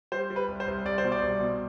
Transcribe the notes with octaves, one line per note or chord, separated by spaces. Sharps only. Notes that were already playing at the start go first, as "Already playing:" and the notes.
G3 C5
G3
B4
C2
C5
C2
C2 D5
C5
B2
D5
C2
B2